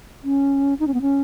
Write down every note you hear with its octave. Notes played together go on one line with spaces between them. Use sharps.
C#4
D#4
C#4
B3
C#4